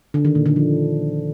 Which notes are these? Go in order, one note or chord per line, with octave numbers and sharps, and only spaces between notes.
D3
D#3
A#2
D3
F3